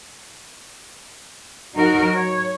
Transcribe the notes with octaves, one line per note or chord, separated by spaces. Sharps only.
F#3 D#4 F#4 A#4
C#5